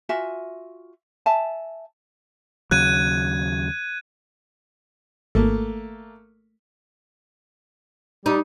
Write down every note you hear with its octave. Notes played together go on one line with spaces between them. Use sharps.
F4 F#4 E5 G#5
E5 G#5 A5
D#2 C#3 F#3 F#6 G#6 D#7
G#1 A3 A#3
G3 D#4